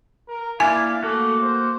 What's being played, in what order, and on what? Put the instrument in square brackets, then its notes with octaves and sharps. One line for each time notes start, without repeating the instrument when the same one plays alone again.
[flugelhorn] A#4
[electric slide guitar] A#3 D4 E4 [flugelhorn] F5 [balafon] G#5
[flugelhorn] A3 [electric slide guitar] A#3 F#4
[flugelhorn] C5